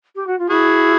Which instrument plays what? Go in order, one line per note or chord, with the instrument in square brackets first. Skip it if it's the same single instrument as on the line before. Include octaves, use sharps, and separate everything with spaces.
[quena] G4
F#4
F4
[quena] E4 [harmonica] F#4 G#4